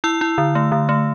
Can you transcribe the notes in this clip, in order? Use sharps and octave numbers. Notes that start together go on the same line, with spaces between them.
E4 E6
E4
D3
A3
D3
A3